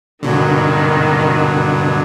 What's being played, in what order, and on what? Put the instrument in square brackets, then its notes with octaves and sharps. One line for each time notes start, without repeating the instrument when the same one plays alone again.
[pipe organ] G2 F#3 [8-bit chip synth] B2 D3 [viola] D#3